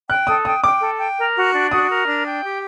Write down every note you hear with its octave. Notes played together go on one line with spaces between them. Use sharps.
G5 F#6
A4 D#6
G5 D#6
G5 D6
A4
G5
A#4
F#4
D4
F#4 D#6
A#4
D4
G5
G4